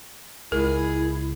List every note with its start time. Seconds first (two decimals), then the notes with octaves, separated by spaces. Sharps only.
0.52 C#2 E4 G#4 A#4